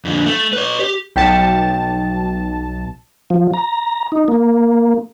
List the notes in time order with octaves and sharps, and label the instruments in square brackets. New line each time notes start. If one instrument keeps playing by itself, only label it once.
[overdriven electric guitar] F2 D3
A3
B4 C#5
G4
[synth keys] B1 A5 [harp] G5 B6 C#7
[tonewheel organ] F3
A#5
D#4
A#3